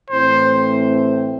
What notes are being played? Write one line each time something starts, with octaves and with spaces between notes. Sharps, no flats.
A2 E3 A3 C4 E4 C5